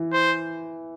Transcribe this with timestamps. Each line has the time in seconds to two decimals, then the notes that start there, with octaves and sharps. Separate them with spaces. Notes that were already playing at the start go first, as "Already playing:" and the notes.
Already playing: E3
0.13 C5